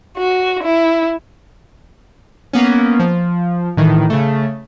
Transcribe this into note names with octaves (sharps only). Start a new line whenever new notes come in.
F#4
E4
A#3 B3 C#4
F3
A2 D#3 E3
C#3 A3